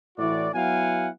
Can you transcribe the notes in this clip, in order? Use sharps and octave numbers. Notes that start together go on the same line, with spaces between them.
A2 E3 E4 F#4 D5
F#3 B3 E4 F5 F#5 G#5